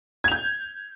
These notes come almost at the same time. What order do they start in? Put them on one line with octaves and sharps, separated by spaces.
G#6 F7 G6